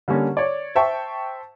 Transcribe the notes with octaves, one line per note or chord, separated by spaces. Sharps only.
D3 G3 A#3 C#4
C#5 D5
C5 E5 G5 A5 C#6